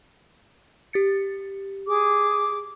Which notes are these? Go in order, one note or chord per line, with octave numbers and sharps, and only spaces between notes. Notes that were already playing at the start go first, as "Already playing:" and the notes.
G4 A6 C#7
G#4 D6